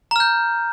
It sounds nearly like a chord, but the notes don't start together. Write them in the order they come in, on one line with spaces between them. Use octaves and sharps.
A#5 F6 G6